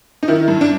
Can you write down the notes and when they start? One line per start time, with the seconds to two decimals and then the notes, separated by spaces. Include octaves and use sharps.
0.23 D#4
0.28 D#3 E4
0.48 G2
0.61 D4